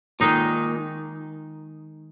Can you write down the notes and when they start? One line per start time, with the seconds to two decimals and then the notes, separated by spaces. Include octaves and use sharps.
0.20 A#2 D#3 G#3 D#4